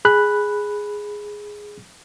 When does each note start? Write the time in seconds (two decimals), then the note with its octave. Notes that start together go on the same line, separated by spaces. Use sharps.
0.05 G#4 B5 F#6